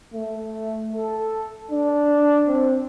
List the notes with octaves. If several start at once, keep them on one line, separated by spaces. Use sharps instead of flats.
A3
A4
D4
C4